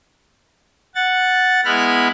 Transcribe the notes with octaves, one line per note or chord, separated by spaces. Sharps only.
F#5 A6
G#3 B3 E4 B5 F6 F#6